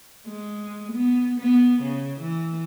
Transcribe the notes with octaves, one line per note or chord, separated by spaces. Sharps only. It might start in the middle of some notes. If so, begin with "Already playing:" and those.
G#3
B3
B3
C#3
E3